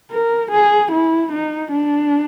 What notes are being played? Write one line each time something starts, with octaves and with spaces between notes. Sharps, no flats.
A#4
G#4
E4
D#4
D4